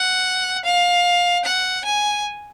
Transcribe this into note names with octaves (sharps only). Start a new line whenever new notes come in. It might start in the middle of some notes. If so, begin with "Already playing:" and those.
Already playing: F#5
F5
F#5
G#5